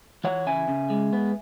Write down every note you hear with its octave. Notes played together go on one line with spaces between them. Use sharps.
E3 C#5 F#5
C#3 E5 G#5
C#3
G#3
B3